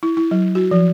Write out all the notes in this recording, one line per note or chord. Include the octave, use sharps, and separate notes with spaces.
E4
E4
F#3
F#4
F3